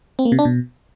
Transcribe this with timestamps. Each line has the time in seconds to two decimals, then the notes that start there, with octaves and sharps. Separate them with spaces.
0.19 C4
0.25 A#3
0.32 C3
0.39 D4
0.45 B2